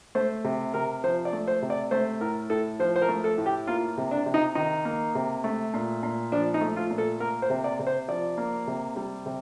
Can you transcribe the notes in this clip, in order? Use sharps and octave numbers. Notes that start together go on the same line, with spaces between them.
A3 C5
C3
C3 A#4
F3 C5
D5
A3
C5
C3
D5
A3 C5
A2 A#4
A2 A4
F3 C5
C5
A#4
A3
A4
A2
G4
A#3 F4
C3
D4
C3
D#4
D#3 D#4
A#3
C3
A3
A#2
A#2
F3 D4
D#4
A3
F4
A#2
A4
A#3 A#4
C5
C3
D5
C3
C5
F3 D5
A#3
C3
G3
C3